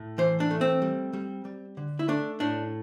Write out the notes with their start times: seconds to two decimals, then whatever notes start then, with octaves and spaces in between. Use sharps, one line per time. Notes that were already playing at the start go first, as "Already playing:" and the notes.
Already playing: A2
0.18 E3 C5
0.40 D4
0.51 A3
0.61 C4
0.82 G3
1.13 G3
1.45 G3
1.77 D3
1.99 E4
2.08 A3 D4
2.40 A2 D4